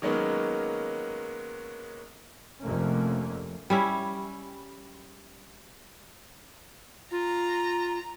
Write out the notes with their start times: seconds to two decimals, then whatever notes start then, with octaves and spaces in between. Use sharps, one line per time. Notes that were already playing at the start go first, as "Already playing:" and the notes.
0.02 D#3 F#3 G#3 A#3 B3 C#4
2.63 F1 F2 C3 A3 A#3 C#4
3.70 G3 C#4 E4
7.11 F4 A#5